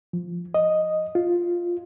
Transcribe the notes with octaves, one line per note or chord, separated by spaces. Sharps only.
F3
D#5
F4